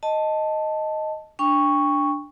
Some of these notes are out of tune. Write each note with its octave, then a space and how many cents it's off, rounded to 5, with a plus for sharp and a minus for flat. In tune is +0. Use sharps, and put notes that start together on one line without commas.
D#5 +0 A5 +0
D4 +0 G5 +35 C#6 +0